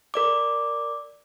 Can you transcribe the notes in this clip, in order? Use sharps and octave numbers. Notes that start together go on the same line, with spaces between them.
A#4 D5 D6